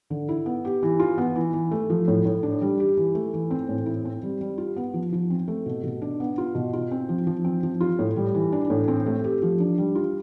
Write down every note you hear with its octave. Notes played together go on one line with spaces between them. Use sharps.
D3
E4
B3
G4
E3
F4
B3
E3
E3
A3
F3
A2
A2
D4
G3
G4
E3
A3
E3
C4
A2
E4
C4
G3
G3
F4
B3
F3
F3
C4
A3
B2
B2
D4
B3
F4
B2
F4
C4
F3
F3
C4
F3
F4
A2
G3
E3
D4
A2
C4
A3
G4
F3
D4
G3
F4